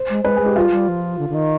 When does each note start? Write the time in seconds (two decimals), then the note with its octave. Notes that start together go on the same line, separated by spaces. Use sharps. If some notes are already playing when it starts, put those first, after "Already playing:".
Already playing: C5
0.10 G#3
0.24 G#3 B4
0.36 G#3 G#4
0.46 G4
0.56 G3 F4
0.72 G3
0.88 F3
1.19 D3
1.29 D3
1.34 D#3